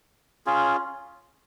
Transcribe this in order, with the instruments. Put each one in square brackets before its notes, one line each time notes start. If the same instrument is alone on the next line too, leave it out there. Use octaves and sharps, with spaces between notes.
[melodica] C#4 F4 G#4